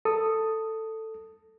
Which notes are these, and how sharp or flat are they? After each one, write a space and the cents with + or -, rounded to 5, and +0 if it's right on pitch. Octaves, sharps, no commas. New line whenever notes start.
A4 +10 D#6 +0